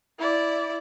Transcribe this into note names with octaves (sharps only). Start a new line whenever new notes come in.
E4 D5